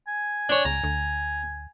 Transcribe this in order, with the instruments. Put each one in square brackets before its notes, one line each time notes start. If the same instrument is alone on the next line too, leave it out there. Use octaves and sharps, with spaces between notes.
[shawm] G#5
[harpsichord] D4 C#5
[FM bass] C#2 [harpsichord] A#5
[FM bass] D2